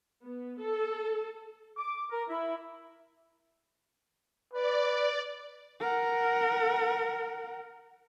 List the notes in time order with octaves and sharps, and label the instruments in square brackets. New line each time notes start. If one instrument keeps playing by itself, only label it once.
[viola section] B3
A4
[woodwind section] D6
A#4
E4
[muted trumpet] B4 [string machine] D5
[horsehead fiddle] A#4 F#5